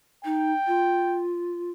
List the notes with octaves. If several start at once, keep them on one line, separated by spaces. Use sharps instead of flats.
D#4 G5
F4